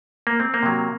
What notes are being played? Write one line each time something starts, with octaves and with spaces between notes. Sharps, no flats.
A#3
C4
A#3
C3 F#3